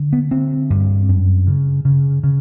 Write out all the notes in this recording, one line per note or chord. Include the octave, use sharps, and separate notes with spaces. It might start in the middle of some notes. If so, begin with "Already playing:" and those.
Already playing: D3
B3
D3 C4
G2
F#2
C#3
C#3
C#3